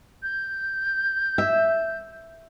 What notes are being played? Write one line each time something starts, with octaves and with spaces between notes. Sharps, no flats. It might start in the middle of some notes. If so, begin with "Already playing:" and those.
G6
E5